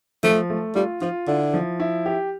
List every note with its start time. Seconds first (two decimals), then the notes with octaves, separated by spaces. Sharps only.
0.23 F3 A3
0.50 A3
0.75 G3 F4
1.01 F3 F4
1.27 D3 E4
1.53 F3
1.80 E4
2.06 G4